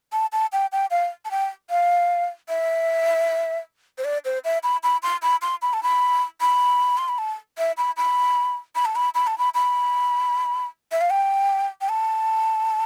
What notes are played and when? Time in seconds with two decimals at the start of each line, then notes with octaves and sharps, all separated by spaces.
0.13 A5
0.32 A5
0.53 G5
0.72 G5
0.91 F5
1.25 A5
1.31 G5
1.70 F5
2.49 E5
3.98 C5
4.04 D5
4.25 C5
4.45 E5
4.63 B5
4.83 B5
5.03 C6
5.22 B5
5.42 C6
5.62 B5
5.73 A5
5.83 B5
6.41 B5
6.98 C6
7.08 B5
7.18 A5
7.58 E5
7.77 B5
7.97 B5
8.75 B5
8.85 A5
8.96 B5
9.15 B5
9.27 A5
9.38 B5
9.55 B5
10.92 E5
11.01 F5
11.10 G5
11.81 G5
11.89 A5